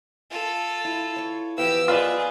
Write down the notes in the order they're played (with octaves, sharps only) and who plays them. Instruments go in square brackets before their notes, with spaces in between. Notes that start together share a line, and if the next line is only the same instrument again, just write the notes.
[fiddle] F4 A4
[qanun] E4
C#5 C#6
[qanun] E3 F3 B3 [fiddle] G4 E6 [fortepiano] F5
[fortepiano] F4 B4 D5 [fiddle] G#4 [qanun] D#5